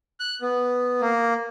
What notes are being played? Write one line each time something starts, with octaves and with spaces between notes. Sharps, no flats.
F#6
B3
A#3